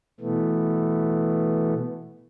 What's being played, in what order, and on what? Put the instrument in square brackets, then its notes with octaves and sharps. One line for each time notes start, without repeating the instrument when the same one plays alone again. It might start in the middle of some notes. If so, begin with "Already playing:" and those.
[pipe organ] B2 E3 A3 B3